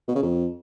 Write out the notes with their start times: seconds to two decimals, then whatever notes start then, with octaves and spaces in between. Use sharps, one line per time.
0.08 B2
0.15 C#3
0.22 F2